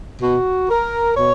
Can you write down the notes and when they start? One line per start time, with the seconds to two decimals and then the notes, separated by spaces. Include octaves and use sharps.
0.22 B2 F#4
0.70 A#4
1.16 B2 C#5